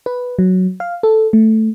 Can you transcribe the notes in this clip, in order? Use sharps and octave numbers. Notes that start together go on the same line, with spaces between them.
B4
F#3
F5
A4
A3